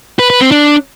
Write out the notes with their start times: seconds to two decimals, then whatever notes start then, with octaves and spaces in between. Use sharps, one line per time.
0.19 B4
0.30 B4
0.41 C4
0.52 D4